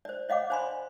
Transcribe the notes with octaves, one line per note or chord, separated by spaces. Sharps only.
C5 D5
C#5 D#5 F5 F#5 D6
C5 D5 G#5 B5 C6